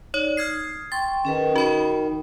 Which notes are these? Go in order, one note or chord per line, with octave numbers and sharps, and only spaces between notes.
D#4 C#5 D5
D#6 F6 G#6 C7
G5 C6 C#6 A6
D#3 C#4 G#4 B4
D#4 F#4 B5